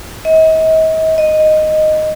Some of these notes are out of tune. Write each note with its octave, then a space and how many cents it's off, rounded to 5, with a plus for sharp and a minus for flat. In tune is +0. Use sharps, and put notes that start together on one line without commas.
D#5 +40
D#5 -5